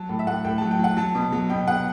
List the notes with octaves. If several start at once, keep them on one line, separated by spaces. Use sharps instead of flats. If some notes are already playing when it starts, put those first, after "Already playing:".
Already playing: F#3 A5
A2
E5
A2 F#5
A2 G5
F#3 A5
G5
F#3 F#5
F#3 A5
B2
F#3
B2 G5
B2 F#5